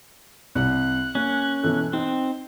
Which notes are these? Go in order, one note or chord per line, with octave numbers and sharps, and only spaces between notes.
C2 F#6
A#3 C#4
B2 E3 A4
C4 D#4